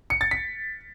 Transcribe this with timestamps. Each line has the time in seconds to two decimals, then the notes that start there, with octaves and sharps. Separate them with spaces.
0.10 C#7
0.21 A6
0.31 B6